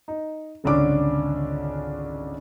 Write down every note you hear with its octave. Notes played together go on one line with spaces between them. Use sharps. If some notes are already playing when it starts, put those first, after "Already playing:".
D#4
G#1 C#2 D3 C#4 D4 D6